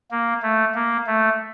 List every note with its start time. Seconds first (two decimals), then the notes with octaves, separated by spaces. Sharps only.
0.11 A#3
0.43 A3
0.75 A#3
1.07 A3